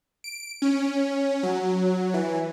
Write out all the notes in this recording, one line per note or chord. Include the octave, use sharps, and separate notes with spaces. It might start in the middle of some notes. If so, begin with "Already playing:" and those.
D7
C#4
F#3
E3